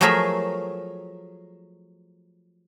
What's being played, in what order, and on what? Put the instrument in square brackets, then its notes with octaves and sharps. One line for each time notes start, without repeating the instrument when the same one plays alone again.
[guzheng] F3 F#3 A3 G#4 A#4 E5